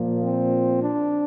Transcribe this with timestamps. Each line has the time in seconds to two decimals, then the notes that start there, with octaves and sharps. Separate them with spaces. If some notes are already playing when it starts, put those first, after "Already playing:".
Already playing: A#2 F3 A#3
0.23 C4
0.82 D4